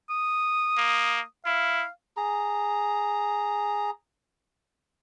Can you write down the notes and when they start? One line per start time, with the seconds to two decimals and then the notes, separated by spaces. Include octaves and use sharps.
0.10 D#6
0.77 A#3
1.46 E4 F5
2.17 G#4 A#5